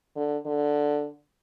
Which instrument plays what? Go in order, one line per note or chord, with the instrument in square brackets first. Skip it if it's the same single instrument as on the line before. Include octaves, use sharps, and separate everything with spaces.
[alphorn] D3
D3